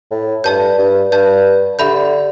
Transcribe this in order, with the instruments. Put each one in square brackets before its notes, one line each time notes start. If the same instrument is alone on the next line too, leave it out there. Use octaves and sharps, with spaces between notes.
[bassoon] A2
[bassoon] G2 [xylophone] D5 A5 G6
[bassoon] G2
[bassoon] G2 [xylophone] D5 A5 G6
[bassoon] D3 [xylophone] G4 E5 B5 G6